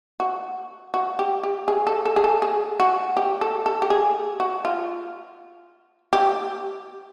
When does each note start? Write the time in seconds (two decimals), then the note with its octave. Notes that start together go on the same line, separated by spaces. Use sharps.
0.20 F#4
0.94 F#4
1.19 G4
1.43 G4
1.68 G#4
1.87 A4
2.05 A4
2.16 G#4
2.24 A4
2.42 G#4
2.80 F#4
3.17 G4
3.41 A4
3.66 A4
3.82 G4
3.90 G#4
4.40 F#4
4.65 F4
6.13 G4